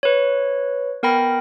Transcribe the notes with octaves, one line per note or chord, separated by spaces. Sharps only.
B4 C#5
B3 A#4 G5 B5 A#6